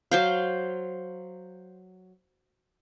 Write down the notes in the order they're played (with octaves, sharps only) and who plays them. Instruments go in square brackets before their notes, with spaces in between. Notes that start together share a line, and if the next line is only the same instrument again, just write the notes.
[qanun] F#3 C5 F5